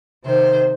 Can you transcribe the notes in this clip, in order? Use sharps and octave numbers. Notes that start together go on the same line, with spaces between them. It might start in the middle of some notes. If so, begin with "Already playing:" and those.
C3 D#3 C5